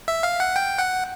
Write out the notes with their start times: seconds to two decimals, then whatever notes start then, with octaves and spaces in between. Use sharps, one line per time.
0.08 E5
0.23 F5
0.40 F#5
0.56 G5
0.78 F#5